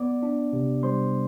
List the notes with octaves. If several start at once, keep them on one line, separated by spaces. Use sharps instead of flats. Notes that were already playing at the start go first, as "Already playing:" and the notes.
Already playing: B3 D5 D6
D4
C3
G3 C5 C6